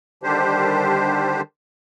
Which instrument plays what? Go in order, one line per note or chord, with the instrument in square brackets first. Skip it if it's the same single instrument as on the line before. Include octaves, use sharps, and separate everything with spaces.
[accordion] D3 D#3 G3 D4 G4 C5